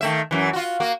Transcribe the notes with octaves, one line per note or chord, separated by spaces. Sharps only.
D#3 A3 E5
F#2 E3
F4 F#4
A#3 F#4